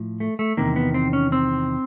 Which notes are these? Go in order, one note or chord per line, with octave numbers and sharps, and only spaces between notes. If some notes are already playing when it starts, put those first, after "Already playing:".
Already playing: A2 F3
A3
A3
E2 C3 D#3 A#3
B3
C4
C#4
C4